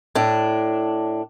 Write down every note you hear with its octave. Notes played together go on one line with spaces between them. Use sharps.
A2 D4